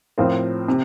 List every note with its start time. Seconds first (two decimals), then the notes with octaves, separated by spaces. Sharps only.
0.18 A2 F3 C4 F4 A#4
0.68 C3